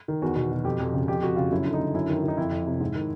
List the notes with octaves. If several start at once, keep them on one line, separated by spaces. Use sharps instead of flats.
D#3
E2 F#4
B2
B2
F2 G4
F2
C#3
F2 G4
F2 F#4
C#3 F4
F#2 E4
D3
D#4
D3
F#2 E4
D#3
D#3 D#4
F2 E4
F2
C3
G#2
D#3